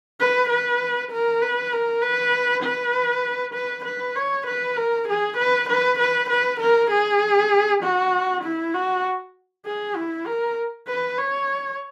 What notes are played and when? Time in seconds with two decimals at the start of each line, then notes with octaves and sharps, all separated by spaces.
0.20 B4
0.50 B4
1.12 A#4
1.42 B4
1.73 A#4
2.02 B4
2.63 B4
3.55 B4
3.85 B4
4.16 C#5
4.47 B4
4.77 A#4
5.08 G#4
5.38 B4
5.70 B4
5.99 B4
6.30 B4
6.60 A#4
6.91 G#4
7.83 F#4
8.44 E4
8.74 F#4
9.66 G#4
9.96 E4
10.27 A#4
10.88 B4
11.18 C#5